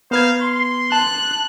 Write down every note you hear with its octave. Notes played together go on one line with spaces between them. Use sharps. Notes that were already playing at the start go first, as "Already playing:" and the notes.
B3 D#4 B4 C5 F5 G#6
C6
A5 F#6